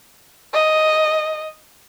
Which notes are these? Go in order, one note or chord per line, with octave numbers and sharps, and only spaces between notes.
D#5